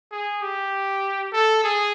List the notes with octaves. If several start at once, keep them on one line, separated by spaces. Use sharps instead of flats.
G#4
G4
A4
G#4